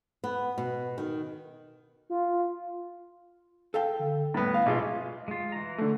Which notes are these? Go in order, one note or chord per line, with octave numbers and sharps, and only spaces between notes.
B3
B2
D#3
F4
A4 F5 G5
D3
A2 G3 B3
F5
A#1 B2 G#3 F4
G#3 F4
E3 A#5
D3 A3